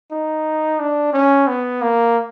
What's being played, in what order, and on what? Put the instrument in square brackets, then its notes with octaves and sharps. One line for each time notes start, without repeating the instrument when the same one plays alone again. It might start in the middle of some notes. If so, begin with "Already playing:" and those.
[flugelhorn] D#4
D4
C#4
B3
A#3